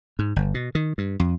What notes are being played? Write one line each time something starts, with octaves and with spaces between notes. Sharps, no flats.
G#2
G1
B2
D#3
G2
F2